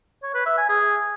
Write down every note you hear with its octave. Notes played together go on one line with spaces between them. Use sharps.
C#5
B4
E5
G#5
G#4